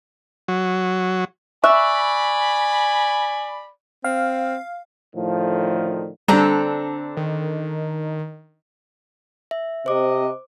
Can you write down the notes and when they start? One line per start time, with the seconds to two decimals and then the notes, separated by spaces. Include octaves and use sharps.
0.48 F#3
1.64 D5 E5 G#5 B5 C#6 F#6
4.04 C4 F5
5.16 A2 D3 D#3 F3
6.28 D3 G3 C4 D4 A4 A#5
7.17 D#3
9.51 E5
9.86 C3 C5 D#5 D6